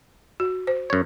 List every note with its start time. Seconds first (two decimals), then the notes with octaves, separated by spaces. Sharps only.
0.40 F#4
0.67 C5
0.90 F#2 C#5